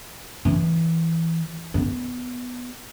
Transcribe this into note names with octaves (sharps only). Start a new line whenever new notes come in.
E3
B3